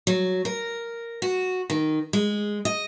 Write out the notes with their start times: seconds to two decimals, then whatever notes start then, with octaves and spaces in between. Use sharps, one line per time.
0.07 F#3
0.45 A#4
1.22 F#4
1.70 D#3
2.13 G#3
2.65 D#5